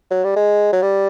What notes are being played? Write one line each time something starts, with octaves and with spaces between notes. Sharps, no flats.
F#3
G3
G#3
F#3
G3